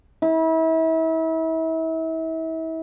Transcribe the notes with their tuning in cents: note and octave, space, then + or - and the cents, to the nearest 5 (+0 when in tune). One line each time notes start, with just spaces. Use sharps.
E4 -35